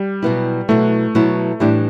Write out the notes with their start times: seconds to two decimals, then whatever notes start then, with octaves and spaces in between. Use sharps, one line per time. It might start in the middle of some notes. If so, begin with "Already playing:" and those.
Already playing: G3
0.23 B2 F#3 B3 E4
0.69 B2 F#3 A3 B3 E4
1.15 B2 F#3 B3 E4
1.60 A2 E3 G3 D4 E4 G4